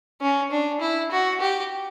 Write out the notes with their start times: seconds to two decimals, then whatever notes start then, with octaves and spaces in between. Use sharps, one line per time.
0.21 C#4
0.51 D4
0.81 E4
1.12 F#4
1.41 G4